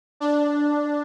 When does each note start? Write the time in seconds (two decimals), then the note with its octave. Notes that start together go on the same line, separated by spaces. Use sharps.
0.20 D4